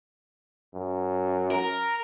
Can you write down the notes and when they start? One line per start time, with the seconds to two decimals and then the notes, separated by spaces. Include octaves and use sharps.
0.75 F#2
1.51 A#4